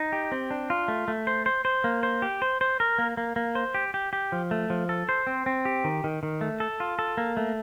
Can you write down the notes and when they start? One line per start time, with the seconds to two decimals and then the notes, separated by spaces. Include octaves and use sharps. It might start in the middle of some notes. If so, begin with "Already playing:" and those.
Already playing: D#4
0.12 G4
0.32 C4
0.51 D4
0.70 F4
0.88 A3
1.08 A3
1.27 C5
1.46 C5
1.65 C5
1.84 A#3
2.03 C5
2.22 G4
2.42 C5
2.61 C5
2.80 A#4
2.98 A#3
3.17 A#3
3.36 A#3
3.55 C5
3.75 G4
3.94 G4
4.13 G4
4.32 F3
4.51 A3
4.70 F3
4.89 A4
5.09 C5
5.27 C4
5.46 C4
5.65 G4
5.84 D#3
6.04 D#3
6.23 D#3
6.41 A3
6.60 A4
6.80 F4
6.99 A4
7.17 A#3
7.37 A3